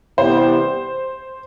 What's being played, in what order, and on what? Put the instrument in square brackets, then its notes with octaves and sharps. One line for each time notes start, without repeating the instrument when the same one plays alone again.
[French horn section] C3 E3 G3 B3 [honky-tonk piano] C5